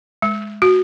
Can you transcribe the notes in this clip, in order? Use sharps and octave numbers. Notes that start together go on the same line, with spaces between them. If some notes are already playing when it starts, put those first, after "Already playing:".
G#3
F#4